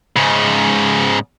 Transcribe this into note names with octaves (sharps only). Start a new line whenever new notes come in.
G#2 C#3